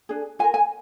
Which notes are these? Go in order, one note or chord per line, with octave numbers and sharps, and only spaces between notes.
D4 G#4
F4 A#4 G#5
G#5